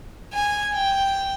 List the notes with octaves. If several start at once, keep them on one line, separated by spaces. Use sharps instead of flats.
G#5
G5